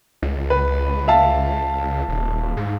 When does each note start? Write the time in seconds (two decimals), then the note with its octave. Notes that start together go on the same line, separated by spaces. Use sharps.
0.22 C#2
0.50 B4
1.08 E5 F5 A5
2.08 D#1
2.57 G#2